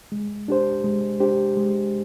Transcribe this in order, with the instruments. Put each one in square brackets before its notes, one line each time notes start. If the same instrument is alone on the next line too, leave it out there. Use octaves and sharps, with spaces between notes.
[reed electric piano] G#3
D4 G4 C5
G#3
D4 G4 C5
G#3